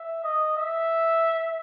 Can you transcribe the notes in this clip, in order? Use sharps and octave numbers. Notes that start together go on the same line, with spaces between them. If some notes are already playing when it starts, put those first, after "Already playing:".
Already playing: E5
D#5
E5